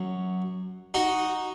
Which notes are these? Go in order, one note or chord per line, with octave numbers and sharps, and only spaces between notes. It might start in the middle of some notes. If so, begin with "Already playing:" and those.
Already playing: F#2 F#3
D#4 F#4